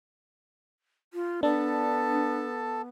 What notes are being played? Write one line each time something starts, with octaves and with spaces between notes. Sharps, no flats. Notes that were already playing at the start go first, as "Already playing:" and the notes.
F4
B3 D4 A4 A5